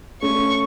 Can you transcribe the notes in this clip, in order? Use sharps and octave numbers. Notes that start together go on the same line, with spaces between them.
A3 C#4 C#6